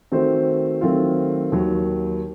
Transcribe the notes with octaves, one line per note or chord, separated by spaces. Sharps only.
D#3 A3 C4 F#4 C5
D#3 F#3 A3 C4 F4
D#2 D#3 F#3